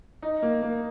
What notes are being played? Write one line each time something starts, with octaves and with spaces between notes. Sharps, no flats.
D#4
A#3
A#3